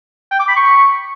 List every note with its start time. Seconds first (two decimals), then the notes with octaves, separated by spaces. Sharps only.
0.31 G5
0.39 D6
0.48 B5
0.56 C#6